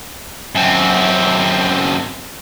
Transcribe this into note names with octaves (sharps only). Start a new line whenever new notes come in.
F#2 C4